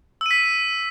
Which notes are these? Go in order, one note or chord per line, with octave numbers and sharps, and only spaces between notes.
E6 B6 D#7